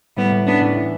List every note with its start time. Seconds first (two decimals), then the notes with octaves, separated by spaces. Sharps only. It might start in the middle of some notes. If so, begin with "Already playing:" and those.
0.16 A2 G3 B3
0.31 A2
0.46 B3 C#4 D4
0.61 A2
0.77 E3